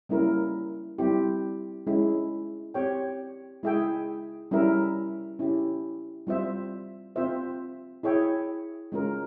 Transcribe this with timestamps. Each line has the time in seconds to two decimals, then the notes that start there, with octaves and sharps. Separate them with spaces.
0.09 G3 A#3 C#4 E4 A#4
0.98 G3 C4 E4 G4
1.87 G#3 C#4 E4
2.74 C4 G4 C#5 G5
3.63 G#3 E4 G#4 E5 G5
4.51 G3 C#4 E4 A#4 E5
5.39 C#4 E4 G4
6.27 G3 C4 F4 C5 E5
7.16 C4 F4 C5 E5
8.03 E4 G#4 C#5 E5 G5
8.92 G#3 C#4 F4 A#4